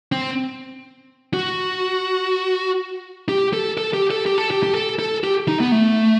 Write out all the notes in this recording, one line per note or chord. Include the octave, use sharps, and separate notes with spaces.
C4
F#4
G4
A4
A4
G4
A4
G4
A4
G4
G4
A4
A4
G4
D#4
B3
A3